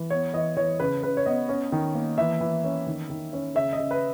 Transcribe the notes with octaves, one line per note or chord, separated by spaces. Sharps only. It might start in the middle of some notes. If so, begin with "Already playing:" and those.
Already playing: E3
B3 C#5
E3 D#5
E3 C#5
C#3 B4
C#3 B4
C#5
B3 D#5
C#4
D#3
A#3
E3 E5
E3
C#4
D#3
D#3
C#4
C#3 E5
D#5
C#3
B4